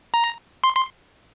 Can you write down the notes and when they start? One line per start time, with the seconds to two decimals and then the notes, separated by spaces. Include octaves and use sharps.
0.14 A#5
0.64 C6
0.76 C6